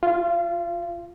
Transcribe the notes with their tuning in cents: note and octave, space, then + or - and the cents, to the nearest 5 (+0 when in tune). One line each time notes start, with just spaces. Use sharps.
F4 +0 F5 -35